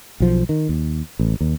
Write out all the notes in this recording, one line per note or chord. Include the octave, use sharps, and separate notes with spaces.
B1 F3
D#3
D#2
A1
D#2